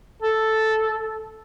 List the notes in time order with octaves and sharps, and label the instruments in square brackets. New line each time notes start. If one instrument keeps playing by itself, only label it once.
[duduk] A4